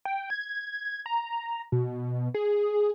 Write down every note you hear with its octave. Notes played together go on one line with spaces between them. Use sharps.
G5
G#6
A#5
B2
G#4